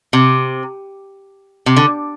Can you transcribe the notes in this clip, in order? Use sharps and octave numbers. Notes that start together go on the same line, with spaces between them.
C3
C3
D3